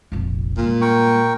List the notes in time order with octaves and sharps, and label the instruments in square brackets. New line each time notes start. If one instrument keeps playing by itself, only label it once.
[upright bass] F1 A#1
[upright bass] G2 G#3 [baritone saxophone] A#2
[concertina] A#4 G5 C#6